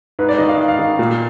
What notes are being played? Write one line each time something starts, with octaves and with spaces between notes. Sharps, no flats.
G#2 B4
D5
D#3 D#5
F5
G#2 D#5
F5
D#3
A#2